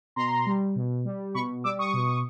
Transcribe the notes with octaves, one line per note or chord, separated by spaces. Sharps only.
B2 A#5 C6
G3
B2
G3
B2 B5 C#6
G3 D6 E6
C#6 D#6
B2